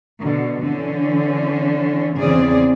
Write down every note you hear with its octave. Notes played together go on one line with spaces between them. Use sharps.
B2 D3
D3 E3 C#4
E2 C#3 C4 G#4 D5